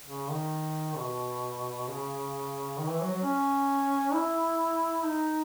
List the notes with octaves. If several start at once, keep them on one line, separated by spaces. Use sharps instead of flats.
C#3
D#3
B2
C#3
D#3
E3
F#3
F#3
C#4
E4
D#4